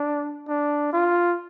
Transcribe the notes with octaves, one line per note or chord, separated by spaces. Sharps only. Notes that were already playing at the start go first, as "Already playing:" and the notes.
Already playing: D4
D4
F4